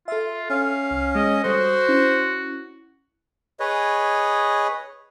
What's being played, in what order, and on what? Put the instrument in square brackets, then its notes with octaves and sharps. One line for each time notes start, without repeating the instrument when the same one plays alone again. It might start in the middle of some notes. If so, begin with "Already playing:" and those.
[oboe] F4 [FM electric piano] A4 E5
[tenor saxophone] C#4 [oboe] F5
[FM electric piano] C2
[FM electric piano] G#3 [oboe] D#5
[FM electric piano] G3 A4 D#6 [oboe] F#4 [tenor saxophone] C5
[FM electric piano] C#4 E4
[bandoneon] G#4 B4 C#5 D#5